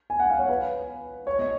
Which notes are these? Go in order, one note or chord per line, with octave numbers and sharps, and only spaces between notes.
G#5
F#5
F5
C#5
B4
C#5
D#5